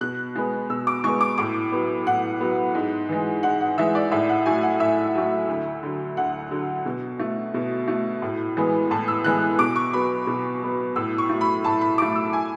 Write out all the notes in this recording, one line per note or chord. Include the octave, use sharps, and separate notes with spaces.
B2 F#6
G#3 B3
B2 E6
D6
G#3 B3 C#6
D6
A2 D6
F#3 B3
A2 F#5
F#3 B3
G#2
E3 G#3
G#2 F#5
F#5
E3 G#3 E5
D5
A2 E5
F#5
F#3 A3 G#5
F#5
A2 E5
F#3 A3
D2
D3 F#3
D2 F#5
D3 F#3
B2
A3
B2
A3
A2
E3 G#3 B3
A2 A5
E6
E3 G#3 B3 F#6
B2 D6
C#6
F#3 B3 B5
B2
F#3 B3
A2 E6
C#6
F#3 A3
B5
A2 A5
B5
F#3 A3 D6
E6
G#5